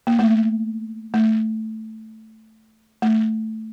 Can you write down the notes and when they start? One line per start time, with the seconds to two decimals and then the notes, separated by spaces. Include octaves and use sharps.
0.07 A#3
0.19 A3
1.14 A3
3.02 A3